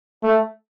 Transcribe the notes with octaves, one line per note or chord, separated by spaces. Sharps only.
A3